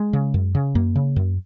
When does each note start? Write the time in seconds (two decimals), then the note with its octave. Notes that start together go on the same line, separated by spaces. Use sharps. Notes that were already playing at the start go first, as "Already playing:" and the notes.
Already playing: G#3
0.13 C#3
0.34 F#2
0.55 C#3
0.75 F#2 A#3
0.96 C#3
1.16 F#2